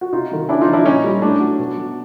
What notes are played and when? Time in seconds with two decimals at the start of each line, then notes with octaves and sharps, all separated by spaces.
0.01 F#4
0.12 C3 D#4 F4
0.31 D#3 F#3
0.49 C#3 D4 E4
0.61 D#4 F4
0.68 F3
0.73 D4 E4
0.85 A#2 C#4 D#4
1.04 G3
1.22 A2 D4
1.41 F#3
1.59 B2
1.77 F#3